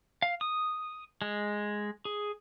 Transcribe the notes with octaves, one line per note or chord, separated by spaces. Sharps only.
F5
D#6
G#3
G#4